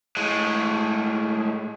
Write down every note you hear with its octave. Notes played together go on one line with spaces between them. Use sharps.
A2 G#3